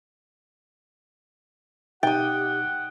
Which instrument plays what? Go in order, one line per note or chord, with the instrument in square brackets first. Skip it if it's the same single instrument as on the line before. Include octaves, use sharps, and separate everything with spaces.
[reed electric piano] B2 D#4 A6 [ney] G4 [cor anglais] F#5 [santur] G5 D#6